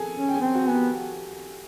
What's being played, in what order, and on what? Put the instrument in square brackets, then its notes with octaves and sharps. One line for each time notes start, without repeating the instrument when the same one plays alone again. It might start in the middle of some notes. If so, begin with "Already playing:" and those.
Already playing: [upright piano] G#4 A4 G#5
[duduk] C#4
[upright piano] G5
G#4 G#5
[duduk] C4
[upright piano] F#4 F#5
[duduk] B3 [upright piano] G#5
[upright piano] G4 G5